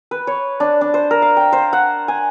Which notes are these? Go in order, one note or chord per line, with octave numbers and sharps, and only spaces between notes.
B4
C#5
D4
D4
C5
A#4
F5
G5
C5
F#5
G#5